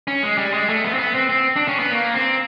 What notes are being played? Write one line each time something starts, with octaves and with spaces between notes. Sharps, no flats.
C#4
G#3
G3
G#3
A3
B3
C4
B3
C4
C4
D4
C#4
B3
A#3
C4